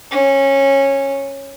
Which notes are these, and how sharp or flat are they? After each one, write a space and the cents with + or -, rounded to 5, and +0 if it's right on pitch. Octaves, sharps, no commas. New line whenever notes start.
C#4 -15